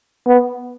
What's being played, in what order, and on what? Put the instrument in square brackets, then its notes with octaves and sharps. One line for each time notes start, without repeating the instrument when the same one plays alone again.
[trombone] B3